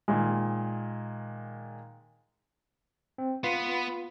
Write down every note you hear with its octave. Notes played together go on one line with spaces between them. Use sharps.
A#2 D#3 G#3
C4
B3 F4 B4 C7